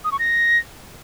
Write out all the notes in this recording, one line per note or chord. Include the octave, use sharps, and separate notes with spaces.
D#6
C#6
A#6